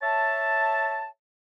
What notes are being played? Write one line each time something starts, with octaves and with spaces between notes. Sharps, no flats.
C#5 E5 A5